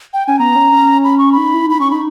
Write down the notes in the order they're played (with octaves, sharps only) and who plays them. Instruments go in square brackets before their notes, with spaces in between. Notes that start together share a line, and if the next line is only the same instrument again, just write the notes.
[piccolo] G5
[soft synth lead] C#4 [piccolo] G#5
[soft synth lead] B3 [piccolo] A#5
[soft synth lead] C#4
C#4
[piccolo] B5
C#6
B5
[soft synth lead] D#4
E4
[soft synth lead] D#4 [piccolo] B5
[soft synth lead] C#4 [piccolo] C#6
[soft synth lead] D#4 [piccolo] B5